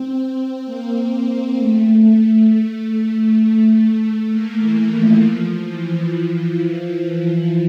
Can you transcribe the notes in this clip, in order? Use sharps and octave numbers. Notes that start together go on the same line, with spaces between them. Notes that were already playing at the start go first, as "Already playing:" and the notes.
Already playing: C4
C4
A#3
A3
A3
A3
A#3
E3
F3
F3
E3
F3